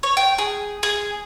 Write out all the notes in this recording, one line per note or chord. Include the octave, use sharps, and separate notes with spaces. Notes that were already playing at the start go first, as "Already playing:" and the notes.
C#5
G5
G#4
G#4